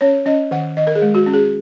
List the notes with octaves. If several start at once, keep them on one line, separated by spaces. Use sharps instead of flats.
C#4 C#5
C#4 D#5
D#3 F#5
D#3 D#5
A#4
G#4
G#3
F#4
C#4
G#4